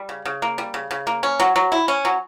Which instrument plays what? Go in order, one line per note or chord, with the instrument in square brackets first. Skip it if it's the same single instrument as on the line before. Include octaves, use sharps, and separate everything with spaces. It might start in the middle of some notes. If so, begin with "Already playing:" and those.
Already playing: [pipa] G3
C#3
C#3
A#3
G3
C#3
C#3
A#3
C#4
F#3
F#3
E4
C#4
F#3